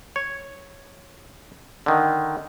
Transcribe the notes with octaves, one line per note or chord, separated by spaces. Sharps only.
C#5
D3 D#3